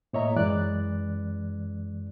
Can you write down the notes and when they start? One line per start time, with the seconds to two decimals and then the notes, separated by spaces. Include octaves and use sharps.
0.13 A2 A#3 C#5 D#5 E5 A#5
0.36 F#2 E3 G#3 D5 F#6